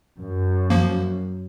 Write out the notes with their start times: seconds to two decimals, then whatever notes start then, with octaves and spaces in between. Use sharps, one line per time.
0.19 F#2
0.70 F3 A#3